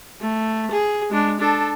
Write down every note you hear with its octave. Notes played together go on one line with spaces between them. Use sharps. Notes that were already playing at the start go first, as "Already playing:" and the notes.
A3
G#4
G#3 D4
D4 A4